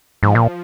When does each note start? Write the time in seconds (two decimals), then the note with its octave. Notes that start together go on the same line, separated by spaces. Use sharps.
0.22 G#2 F3
0.35 A#2